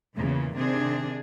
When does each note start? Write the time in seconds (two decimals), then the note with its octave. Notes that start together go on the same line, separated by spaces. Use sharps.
0.16 E2 A#2 C#3 E3
0.57 C3 D#3 C4 D4 G#4